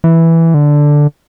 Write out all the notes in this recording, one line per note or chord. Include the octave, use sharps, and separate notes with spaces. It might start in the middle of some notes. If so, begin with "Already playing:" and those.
E3
D3